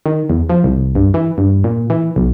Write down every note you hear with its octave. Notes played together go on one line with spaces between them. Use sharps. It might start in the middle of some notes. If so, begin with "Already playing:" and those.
D#3
E2
F3
C2
G2
E3
G2
A#2
E3
B1